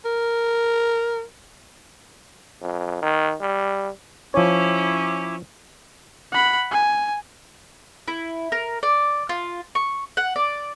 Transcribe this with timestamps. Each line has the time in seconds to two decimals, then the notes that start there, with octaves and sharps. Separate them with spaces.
0.05 A#4
2.62 F2
3.02 D#3
3.41 G3
4.34 F3 C#4 E4 C#5 D6
6.32 F#5 B5
6.71 G#5
8.08 E4
8.52 A#4
8.83 D5
9.29 F4
9.75 C#6
10.17 F#5
10.36 D5